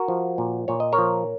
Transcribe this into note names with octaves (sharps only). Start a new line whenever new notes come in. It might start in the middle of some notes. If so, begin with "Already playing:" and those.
Already playing: F#4 A#4
F3
A#2
A#2 C#5
D#5
A#4 C#5
F3